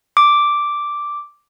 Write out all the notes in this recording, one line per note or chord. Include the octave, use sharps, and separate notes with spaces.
D6